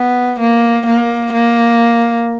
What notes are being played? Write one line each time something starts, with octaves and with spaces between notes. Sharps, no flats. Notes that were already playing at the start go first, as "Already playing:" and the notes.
Already playing: B3
A#3
A#3
A#3